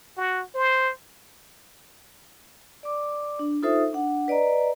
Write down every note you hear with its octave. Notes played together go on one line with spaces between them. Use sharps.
F#4
C5
D5 D6
D4
D#4 F4 A4 C5 E5 D#6
D4 F#5
B4 D5 D#5 A#5